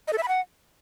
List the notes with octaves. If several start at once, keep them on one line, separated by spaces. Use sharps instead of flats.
D#5
A4
E5
B5
F#5